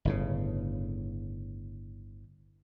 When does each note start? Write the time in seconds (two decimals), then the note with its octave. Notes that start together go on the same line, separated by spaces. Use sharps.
0.05 G1 A2 C#3